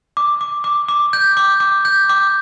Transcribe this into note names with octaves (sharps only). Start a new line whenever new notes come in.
D6
D6
D6
D6
G6
D6
D6
G6
D6